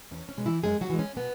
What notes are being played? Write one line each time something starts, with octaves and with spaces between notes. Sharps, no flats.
E2 C#4
C#4
B2 G#3
E3 E4
F#2 G#3 G#4
F#3 F#4
E3 G#3
C#4
B2 B3